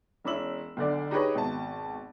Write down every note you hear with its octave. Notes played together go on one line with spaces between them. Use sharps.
E1 C#4 E4 E6 F#7
B1 D3 D5
D#4 G4 G#4 B4 C#5 D#5
G#1 B2 A5